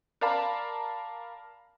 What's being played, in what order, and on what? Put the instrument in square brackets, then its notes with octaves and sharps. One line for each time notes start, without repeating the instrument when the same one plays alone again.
[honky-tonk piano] A#4 D5 F5 A5 B5